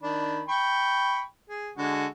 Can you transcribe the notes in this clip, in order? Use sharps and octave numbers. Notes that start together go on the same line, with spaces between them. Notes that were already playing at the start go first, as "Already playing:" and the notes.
D#3 D4 B5
G5 B5 C#6
G#4
D3 G#3 F#4